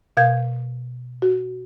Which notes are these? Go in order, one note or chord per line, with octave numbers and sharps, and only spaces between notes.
B2 A#4 F5 G6 G#6
F#4